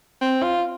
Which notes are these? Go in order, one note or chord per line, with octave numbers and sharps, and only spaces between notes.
C4
F4